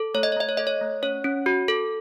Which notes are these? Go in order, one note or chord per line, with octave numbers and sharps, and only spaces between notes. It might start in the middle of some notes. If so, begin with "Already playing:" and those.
Already playing: A4
A3 C#5
D#5
C#5
A3 D#5
C#5
A4 D#5
C#5
A3
C#4 C#5
C#4
F#4
A4